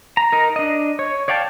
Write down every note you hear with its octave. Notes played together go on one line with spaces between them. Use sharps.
A#5
D#4 A#4
D4 D#5
C#5
C#5 D5 F5 G5 A5